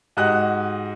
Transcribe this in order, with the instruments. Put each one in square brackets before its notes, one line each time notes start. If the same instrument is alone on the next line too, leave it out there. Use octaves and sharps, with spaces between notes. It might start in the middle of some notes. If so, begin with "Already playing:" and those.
[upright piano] G#2 F#4 G4 D#5 F#5 F#6